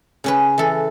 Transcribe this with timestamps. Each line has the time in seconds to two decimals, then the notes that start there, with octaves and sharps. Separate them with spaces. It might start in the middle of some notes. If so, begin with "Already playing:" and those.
0.24 C#3 C#4 B4
0.58 E3 A4